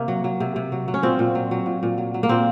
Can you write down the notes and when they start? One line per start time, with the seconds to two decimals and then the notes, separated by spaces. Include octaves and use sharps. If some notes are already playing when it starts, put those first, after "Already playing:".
Already playing: C3 A#3
0.08 F#3
0.24 F#3
0.40 C3
0.56 C3
0.72 F#3
0.88 F#3
0.94 C#4
1.03 A#2 C4
1.19 A#2
1.35 F#3
1.51 F#3
1.66 A#2
1.83 A#2
1.98 F#3
2.14 F#3
2.23 A#3
2.29 A#2 C4